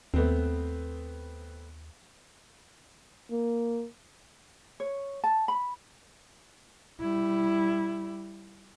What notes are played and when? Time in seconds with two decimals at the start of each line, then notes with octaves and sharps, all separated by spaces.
0.14 D#2 A3 B3 C4
3.31 A#3
4.80 C#5
5.24 A5
5.48 B5
7.00 G3 E4